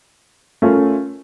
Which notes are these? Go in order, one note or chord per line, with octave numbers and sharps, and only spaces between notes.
A3 C#4 F4 A#4